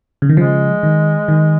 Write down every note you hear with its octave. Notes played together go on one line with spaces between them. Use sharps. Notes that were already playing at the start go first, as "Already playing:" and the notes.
C#3
D#3
C#3 F3 G#3
D#3
D#3